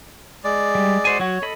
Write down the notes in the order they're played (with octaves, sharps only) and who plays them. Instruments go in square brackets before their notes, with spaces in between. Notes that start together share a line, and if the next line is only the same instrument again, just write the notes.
[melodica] G#3 D5
[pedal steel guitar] G3
F#4 C5 G#5
[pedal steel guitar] F#3 F#4 [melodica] C#5
[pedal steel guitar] A4 D#5 B5